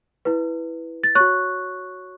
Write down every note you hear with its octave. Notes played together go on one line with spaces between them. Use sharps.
E4 B4
A6
F#4 C#5 C#6 F#6